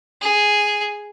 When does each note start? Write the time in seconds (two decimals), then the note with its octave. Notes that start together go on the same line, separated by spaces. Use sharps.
0.21 G#4